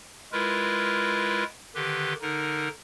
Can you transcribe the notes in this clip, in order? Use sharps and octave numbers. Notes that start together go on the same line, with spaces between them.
G#3 E4 F4 A#4 B4
D3 D#3 G4 B4 C6
D3 D#4 A#4